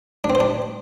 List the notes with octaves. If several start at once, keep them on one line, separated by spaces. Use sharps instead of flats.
D4
C4
C5
D4